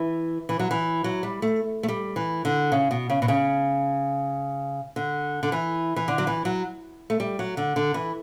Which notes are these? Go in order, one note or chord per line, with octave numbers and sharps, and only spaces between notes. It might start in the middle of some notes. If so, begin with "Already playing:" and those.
Already playing: E3
E3
F#3
E3
F#3
G3
A3
A3
G3
E3
D3
C#3
B2
C#3
B2
C#3
D3
D3
E3
E3
D3
F#3
E3
F#3
A3
G3
F#3
D3
D3
E3